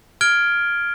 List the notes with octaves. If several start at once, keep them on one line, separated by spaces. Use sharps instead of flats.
F6 G#6 D7 G7